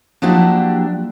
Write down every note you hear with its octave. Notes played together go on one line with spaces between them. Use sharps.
F3 F#3 A#3 D4 E4 G4